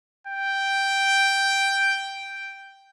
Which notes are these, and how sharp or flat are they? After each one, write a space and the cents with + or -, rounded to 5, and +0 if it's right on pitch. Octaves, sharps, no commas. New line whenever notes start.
G5 +0